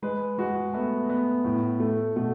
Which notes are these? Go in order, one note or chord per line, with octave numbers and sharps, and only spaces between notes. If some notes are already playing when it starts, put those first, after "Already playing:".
G#3 B4
G#3 F#4
A3 B3
B3
A2
A3
B2 A3